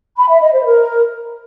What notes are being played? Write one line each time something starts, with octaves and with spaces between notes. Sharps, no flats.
B5
E5
D#5
C5
A#4